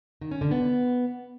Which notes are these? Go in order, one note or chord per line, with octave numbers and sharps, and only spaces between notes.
D#3
C#4
D3
B3